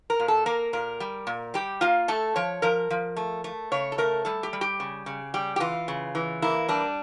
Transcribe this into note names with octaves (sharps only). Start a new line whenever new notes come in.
A#4
A#2
A4
A#3 A#4
A#2 A#4
G3
A#2
G3 G4
A#3 F4
A3 A4
F3 C#5
F3 A#4
F3
A3
A3
C#3 C#5
A4
A3 A#4
G3 A4
G4
G3
G4
C#3
C#3
G3 G4
G4
E3 F4
C#3
E3
A#3 E4
G3 D4